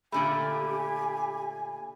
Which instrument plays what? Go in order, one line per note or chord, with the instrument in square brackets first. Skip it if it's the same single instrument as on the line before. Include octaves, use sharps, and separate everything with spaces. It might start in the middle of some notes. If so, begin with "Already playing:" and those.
[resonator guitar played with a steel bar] A#2 D3 A3 [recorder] G4 [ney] G#5 [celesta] B5